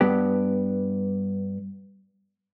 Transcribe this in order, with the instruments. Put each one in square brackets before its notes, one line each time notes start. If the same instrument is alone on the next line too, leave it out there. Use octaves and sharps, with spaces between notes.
[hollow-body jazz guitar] G2 B3 G4